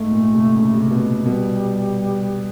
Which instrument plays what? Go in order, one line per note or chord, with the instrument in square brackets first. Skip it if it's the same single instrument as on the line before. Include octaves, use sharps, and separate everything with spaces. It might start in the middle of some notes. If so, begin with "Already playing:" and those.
Already playing: [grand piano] G#2 [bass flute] A3
[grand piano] A#2
C3
C#3
C3
B2
[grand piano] B2 [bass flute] G3